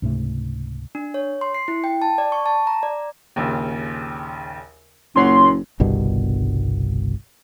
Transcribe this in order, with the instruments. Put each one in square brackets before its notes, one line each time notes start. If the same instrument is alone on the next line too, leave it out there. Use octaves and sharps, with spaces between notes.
[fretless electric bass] C#2 G#2 C3 A3
[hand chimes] D4
C#5
C6
C7
E4
G5
A5
D5
C#6
A5
A#5
D5
[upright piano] A#1 D#2 C#3
[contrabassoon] F#1 [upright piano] A#2 C#5 F#5 [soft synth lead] C6
[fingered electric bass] G1 C2 G2 B2